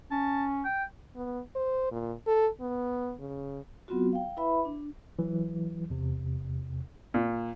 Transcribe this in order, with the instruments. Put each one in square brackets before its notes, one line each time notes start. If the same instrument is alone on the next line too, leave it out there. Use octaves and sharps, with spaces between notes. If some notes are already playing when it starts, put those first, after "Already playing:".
[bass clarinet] C#4 [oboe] A5
[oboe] G5
[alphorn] B3
C5
A#2
A4
B3
C#3
[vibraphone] F#3 B3 C4 F4 F#4
F5 G5
E4 B4 E5 B5
D4
[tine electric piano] E3 F#3
E2 C3
[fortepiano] A#2